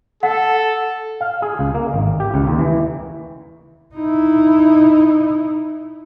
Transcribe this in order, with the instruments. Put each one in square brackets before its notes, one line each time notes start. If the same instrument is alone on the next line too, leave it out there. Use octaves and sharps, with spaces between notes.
[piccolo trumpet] A4 [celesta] F#5
[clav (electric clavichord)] F5
G#4
C#2
A#3
G#1
G4
C#2
D#2
E3
[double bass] D#4 E4